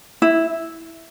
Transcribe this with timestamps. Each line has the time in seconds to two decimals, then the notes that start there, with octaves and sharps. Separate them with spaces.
0.22 E4